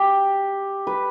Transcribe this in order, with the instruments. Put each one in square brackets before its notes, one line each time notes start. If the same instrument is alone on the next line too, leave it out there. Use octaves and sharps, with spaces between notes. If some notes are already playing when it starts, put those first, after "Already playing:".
Already playing: [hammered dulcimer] G4
B4